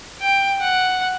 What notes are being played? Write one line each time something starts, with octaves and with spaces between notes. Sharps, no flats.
G5
F#5